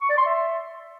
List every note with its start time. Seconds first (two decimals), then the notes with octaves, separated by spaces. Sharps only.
0.01 C#6
0.09 D5
0.17 C6
0.26 E5